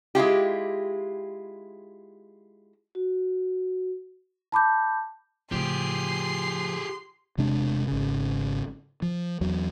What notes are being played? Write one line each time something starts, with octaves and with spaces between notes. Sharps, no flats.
G#3 E4 F4 G4
F#4
A5 B5 D6 G6
A2 C#3 F3 G4 G#4 C6
E1 C3 G#3 D4
G#1 C#3
F3
E2 F#3